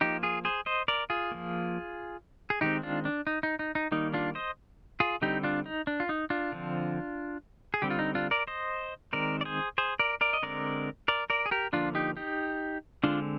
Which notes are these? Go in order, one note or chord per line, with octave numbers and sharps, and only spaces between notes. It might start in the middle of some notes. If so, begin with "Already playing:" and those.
F3 A#3 D#4 G4
F4 G#4
G#4 C5
C5 D#5
A#4 D5
F4 G#4
F3 A#3
G#4
D#3 G#3 C4 D#4 G4
D4 F4
D4
D#4
D#4
D#4
D#4
D#3 G3 A#3 D#4
D4 F4
C5 D#5
F4 G#4
D3 G3 C4 D#4 G4
D4 F4
D#4
D4
F4
D#4
D4 F4
D3 F3 C4
G#4
D3 G3 C4 G4
F4
D#4
D4 F4
A#4 D5
C5 D#5
D#3 G#3 C4 A#4 D5
D5
G#4 C5
G#4 C5
A#4 D5
A#4 D5
D#5
D3 G#3 C4 A#4 D5
A#4 D5
A#4 D5
G#4
G4 A#4
D3 F3 A#3 D4 F4
D#4 G4
D#4 G4
D3 G#3 C4 D4 F4